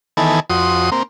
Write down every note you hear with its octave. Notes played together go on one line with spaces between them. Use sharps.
D#3 E3 B3 A4 G#5
F2 F#4 C6 D#6
A#3 C4